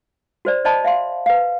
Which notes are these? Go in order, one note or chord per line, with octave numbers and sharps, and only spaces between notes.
F#4 C5 D5
C5 D5 D#5 A5 B5
E5 F5 C6
B4 F5